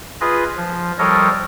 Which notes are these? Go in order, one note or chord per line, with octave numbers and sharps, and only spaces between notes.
F4 G#4 B4 D#5
F3
F3 G3 A4 A#4 C#5 D#5